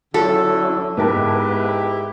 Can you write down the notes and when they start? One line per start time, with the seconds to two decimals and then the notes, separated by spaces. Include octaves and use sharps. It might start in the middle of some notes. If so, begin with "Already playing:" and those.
0.14 D3 F#3 C#4 E4 A4
0.97 G#2 B3 E4 G4 A#4 B4 A5